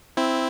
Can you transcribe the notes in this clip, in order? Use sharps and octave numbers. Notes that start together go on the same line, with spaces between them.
C4 E4